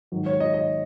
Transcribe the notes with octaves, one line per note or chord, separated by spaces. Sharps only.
G#2 D#3 F#3
C#5
D#5
D#5